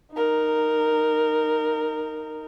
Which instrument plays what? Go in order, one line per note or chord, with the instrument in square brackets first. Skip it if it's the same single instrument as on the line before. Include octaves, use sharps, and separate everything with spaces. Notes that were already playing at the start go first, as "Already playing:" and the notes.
[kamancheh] D#4 A#4